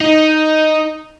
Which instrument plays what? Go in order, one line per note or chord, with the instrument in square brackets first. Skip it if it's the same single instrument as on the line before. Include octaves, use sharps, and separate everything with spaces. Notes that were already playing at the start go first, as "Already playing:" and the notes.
[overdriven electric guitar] D#4